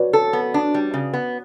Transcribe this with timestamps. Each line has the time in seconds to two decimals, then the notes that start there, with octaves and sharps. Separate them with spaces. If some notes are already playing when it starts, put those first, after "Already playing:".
Already playing: F#4 B4 C#5 D5
0.13 A4
0.33 B3
0.54 D4
0.74 G3
0.94 C#3
1.13 B3